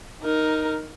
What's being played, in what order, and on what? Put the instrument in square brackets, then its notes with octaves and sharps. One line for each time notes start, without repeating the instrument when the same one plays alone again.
[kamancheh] D#4 A#4